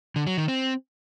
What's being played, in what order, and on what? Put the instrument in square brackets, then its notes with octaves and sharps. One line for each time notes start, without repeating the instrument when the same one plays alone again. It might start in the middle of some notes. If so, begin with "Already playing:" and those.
[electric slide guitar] D3
F#3
D#3
C4